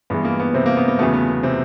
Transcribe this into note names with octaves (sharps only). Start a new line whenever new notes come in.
G2 E3 G#3 B3
A#3
B3
C3 C4
A#3
B3
A#3
E2 C#3 F#3 A3 B3
B3
B3
C3 C4